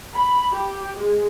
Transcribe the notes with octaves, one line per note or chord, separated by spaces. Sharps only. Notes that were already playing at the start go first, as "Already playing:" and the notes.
B5
G4
G#3